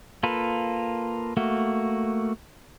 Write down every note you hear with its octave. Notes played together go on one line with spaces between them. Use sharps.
A#3 F4 A4 B4
A3 A#3 F#4